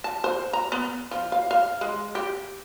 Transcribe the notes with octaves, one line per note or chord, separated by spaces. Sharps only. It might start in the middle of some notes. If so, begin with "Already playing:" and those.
A5
C5
A#5
B3
F3
F5
F5
G#3
G4